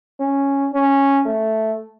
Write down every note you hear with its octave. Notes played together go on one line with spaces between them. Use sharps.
C#4
C#4
A3